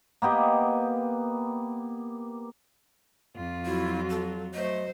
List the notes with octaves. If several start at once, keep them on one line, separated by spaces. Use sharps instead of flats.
A#3 B3 G4 D#5
F2 F4
F#3 E4 F#4
A4
F#3 A3 C5 D#5